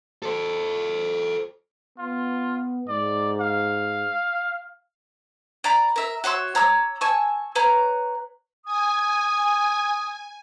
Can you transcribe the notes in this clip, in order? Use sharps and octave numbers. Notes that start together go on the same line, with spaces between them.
A4 C5
B3 F4
G#2 D5
F5
D5 A#5 B5
A#4 E5
F#4 C#5 C6 E6
C#5 A#5 D6 E6
G#5 A5 C#6 E6
B4 C#5 A#5
G#5 D#6